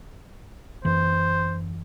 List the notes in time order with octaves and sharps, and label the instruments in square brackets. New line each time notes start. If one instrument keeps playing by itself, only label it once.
[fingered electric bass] F#2 E3 [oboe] C5